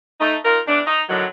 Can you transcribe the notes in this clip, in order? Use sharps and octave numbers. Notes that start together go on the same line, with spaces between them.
A3 D#4
D#4 F4 A#4
E2 E3 D4
D#4
A2 D3 D#3 F#3